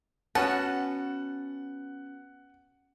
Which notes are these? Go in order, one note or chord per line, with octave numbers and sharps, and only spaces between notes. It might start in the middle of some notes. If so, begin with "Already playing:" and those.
B3 C#4 F#4 F#5 A5